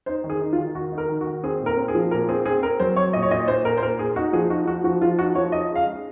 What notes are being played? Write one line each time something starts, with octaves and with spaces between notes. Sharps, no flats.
D#4 C5
D#3
G#4
D#4
F4
D#3
D#3 F#4
D#4
A#4
D#3
F#4
D#3
C4 G#4
A#2
A#4
C4
G#4
F3
A#2 A#4
C4 G#4
C4 G#4
C4 A#4
F#3 C5
F#3 C#5
A#2 D#5
C#5
A#2 D#5
A#2 C5
A#2 A#4
C5
A#2 A#4
A#2 G#4
D#4 F#4
F3 G#4
D#4 F#4
F3 F#4
F3 F#4
F3 F4
D#4 F#4
F3 C#5
D#4 D#5
C#3
F5
G#3